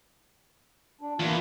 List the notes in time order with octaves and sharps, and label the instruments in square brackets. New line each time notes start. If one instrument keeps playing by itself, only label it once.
[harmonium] D4
[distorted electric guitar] E2 [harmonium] A#3 F4